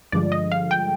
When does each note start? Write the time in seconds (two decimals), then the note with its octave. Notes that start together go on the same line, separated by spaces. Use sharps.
0.12 G2 D3 F3 G#3 D5
0.32 D#5
0.52 F5
0.71 G5